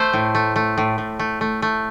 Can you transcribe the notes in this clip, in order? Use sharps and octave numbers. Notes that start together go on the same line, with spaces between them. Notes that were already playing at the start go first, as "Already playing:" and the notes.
Already playing: A3 A4 C5
A2
A3
A3
A2
A2
A3
A3
A3